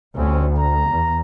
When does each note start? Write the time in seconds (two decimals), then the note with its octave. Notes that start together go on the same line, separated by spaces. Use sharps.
0.16 D2 G3 C4 C#4
0.58 A#5
0.91 E2